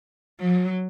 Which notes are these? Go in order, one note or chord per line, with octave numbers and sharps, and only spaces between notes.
F#3